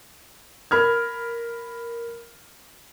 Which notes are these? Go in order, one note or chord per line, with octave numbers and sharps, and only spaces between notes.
A#4 B5 F6 G#6